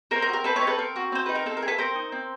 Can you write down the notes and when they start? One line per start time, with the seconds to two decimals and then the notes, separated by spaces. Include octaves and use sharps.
0.11 C4 A#4 C5
0.22 A#4
0.29 F#4
0.33 A#4
0.44 C4 A4 B4
0.56 B4 C#5
0.62 D#4
0.67 A4 B4
0.78 C4 A#4
0.96 F#4
1.12 C4 C5
1.26 D#4 B4
1.35 A#4
1.46 C4 A4
1.57 A#4
1.62 G#4
1.68 A4 B4
1.78 C4 A#4 C5
1.96 D#4
2.12 C4